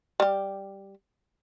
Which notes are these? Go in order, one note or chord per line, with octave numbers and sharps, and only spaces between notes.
G3 G4